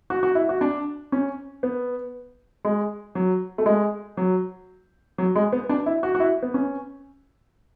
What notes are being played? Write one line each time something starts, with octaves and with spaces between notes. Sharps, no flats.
F#4
F#4
E4
F#4
D4
C#4
B3
G#3
F#3
A3
G#3
F#3
F#3
G#3
B3
D4
E4
F#4
F#4
E4
B3
C#4